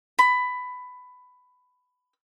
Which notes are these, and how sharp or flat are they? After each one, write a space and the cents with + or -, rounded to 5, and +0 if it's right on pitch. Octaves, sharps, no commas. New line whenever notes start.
B5 +15